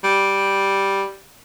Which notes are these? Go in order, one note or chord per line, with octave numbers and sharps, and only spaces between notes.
G3